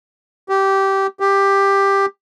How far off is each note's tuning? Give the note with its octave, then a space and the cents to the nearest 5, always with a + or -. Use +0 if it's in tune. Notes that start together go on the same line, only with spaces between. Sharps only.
G4 -15
G4 +10